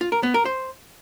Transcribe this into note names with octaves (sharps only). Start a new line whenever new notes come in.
F4
A#4
B3
A#4
C5